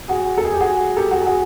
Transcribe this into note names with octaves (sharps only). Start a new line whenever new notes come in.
F#4 G#4
A4
G#4
G4
F#4 G#4
G4 A4
F#4 G#4
A4
F#4 G#4